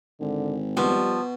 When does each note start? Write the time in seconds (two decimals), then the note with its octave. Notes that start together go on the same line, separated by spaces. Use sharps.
0.20 G#1 D3
0.77 B2 F3 G3